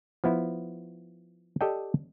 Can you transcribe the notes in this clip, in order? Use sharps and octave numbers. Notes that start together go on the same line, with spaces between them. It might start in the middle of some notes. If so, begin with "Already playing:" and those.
F3 B3 E4
G4 A4 D5 D#5 G5